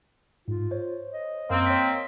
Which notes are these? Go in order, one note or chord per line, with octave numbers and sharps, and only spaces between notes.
G#2 F4
C5 C#5
D#5
F#2 A#3 C4
C#5 B6